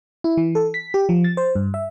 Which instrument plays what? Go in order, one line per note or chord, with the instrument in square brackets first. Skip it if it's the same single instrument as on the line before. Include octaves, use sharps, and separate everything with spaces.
[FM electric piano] E4
E3
A4
B6
G4
F3
A6
C5
G2
E5